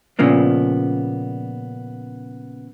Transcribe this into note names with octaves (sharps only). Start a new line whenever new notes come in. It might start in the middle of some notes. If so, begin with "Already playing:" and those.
A#2 C#3 F3 A#3 B3